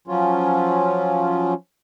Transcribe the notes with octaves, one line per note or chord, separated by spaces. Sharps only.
F3 F#3 C#4 F4